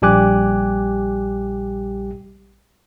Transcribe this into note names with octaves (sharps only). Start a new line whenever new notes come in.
A#1 G3 G4 G#5 D6 F#6